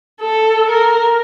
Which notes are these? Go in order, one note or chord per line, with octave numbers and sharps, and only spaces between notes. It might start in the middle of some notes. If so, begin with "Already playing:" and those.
A4
A#4